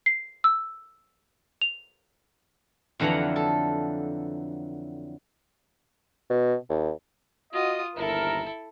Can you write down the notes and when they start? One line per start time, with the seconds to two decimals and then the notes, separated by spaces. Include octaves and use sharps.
0.06 C7
0.44 E6
1.61 F7
3.00 F2 D3 E3 F#3 F#5 A#5
3.36 A4
6.30 B2
6.70 D#2
7.53 F4 F#4 D#5 D#6
7.96 G1 D#2 E4 A4 A#4